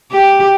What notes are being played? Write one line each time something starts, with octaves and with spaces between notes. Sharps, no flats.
G4